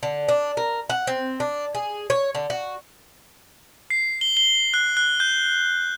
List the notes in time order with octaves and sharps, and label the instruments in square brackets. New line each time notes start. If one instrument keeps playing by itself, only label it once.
[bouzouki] D3
D4
A#4
F#5
C4
D4
G#4
C#5
D3
F#4
[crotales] C7
G7
G7
F#6
F#6
G6